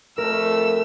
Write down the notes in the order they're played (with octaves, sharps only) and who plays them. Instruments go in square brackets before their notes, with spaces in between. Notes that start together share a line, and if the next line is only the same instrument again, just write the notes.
[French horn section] F2 A3 [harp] A#4 [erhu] E6